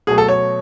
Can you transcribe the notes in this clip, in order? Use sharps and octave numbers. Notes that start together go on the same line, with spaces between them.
B2 F#3 A3 G#4
A4
C#5